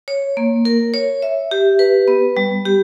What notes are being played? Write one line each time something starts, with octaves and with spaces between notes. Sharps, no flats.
C#5
A#3
A#4
C#5
E5
G4
B4
B3
G3
G4